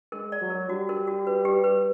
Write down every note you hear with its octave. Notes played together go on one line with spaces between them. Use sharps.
G#3 A#4
D5
F#3
A#4
G3 F#4
A#4
F#4
B4
G4
B4